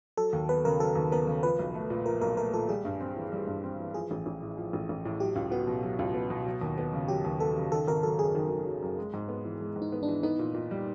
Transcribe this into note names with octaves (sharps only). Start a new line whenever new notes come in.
F#3 A4
D#2
B3 B4
C#3 A#4
F#3 A4
D#2
B3 A#4
C#3
F3 B4
B1
A3
A#2
F3 A#4
B1 A#4
A3 A#4
A#2 A4
G3 G#4
G2
C4
E3
G3
G2
C4
E3
F3 G#4
A1
A1
A2
F3
A1
A1
A2
F#3 G4
C#2
B3 F#4
B2
F#3
C#2
B3
B2
F#3
D#2
B3
C#3
F#3 G4
D#2
B3 A4
C#3
D#3 A4
G#1 A#4
F#3 A4
F#2 G#4
D#3
G#1
F#3
F#2
G#3
G#2
B3
E3
G#3
G#2
D#4
B3
D4
E3
B3 D#4
A#2
A#2
G3